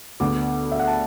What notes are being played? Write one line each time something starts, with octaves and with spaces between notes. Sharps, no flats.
D2 D3 B3 D6
E5
F#5
A5